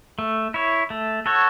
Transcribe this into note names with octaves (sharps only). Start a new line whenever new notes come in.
A3
E4 C#5
A3
F#4 A4 C#5